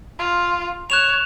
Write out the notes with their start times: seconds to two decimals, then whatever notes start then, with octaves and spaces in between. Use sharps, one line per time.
0.19 F4
0.90 C#5 F#6 E7 F7